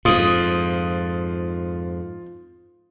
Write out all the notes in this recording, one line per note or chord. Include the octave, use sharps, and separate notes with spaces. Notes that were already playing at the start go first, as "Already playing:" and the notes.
F2 G#2 F4 D#6